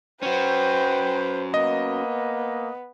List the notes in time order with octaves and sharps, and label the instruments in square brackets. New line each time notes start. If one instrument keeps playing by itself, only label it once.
[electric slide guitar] C#4 F#4 [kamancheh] B4 C5 [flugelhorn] G5
[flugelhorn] A#3 [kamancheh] B3 [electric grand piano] D#5